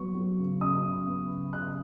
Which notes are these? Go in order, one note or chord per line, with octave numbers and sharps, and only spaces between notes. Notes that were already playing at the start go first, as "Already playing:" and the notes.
Already playing: F#3 B3 C#6
F#3
C#3
C#3 D#6
C#3
B3
C#3
C#3 F#6